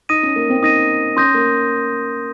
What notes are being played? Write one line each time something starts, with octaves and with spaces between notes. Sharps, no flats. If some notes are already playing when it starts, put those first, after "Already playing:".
D#4 D#6 A#6 D#7
C#4
A#3
C4
D#4 D#6 A#6 D#7
C#4 C6 D#6 G6 A#6
A#3